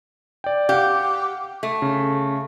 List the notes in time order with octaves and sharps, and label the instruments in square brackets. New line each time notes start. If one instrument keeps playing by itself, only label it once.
[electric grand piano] D5 G5
[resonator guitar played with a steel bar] G4 [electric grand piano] F5 F#5
[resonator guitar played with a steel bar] A3
[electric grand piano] C#3